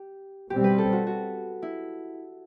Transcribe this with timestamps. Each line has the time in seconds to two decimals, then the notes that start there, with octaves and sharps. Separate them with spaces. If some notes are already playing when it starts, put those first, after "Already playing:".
Already playing: G4
0.50 B2 G3 C4 G4
0.64 B4
0.78 A4
0.93 F#4
1.07 F#4
1.62 E4